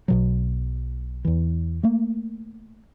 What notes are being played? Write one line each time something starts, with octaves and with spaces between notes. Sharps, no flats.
B1 B2 F#3
E2 E3
A3 A#3